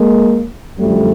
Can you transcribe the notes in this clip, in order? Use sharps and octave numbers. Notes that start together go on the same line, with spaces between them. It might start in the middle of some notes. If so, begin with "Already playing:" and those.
Already playing: G#3 A#3
F#2 D3 F3 G3 A3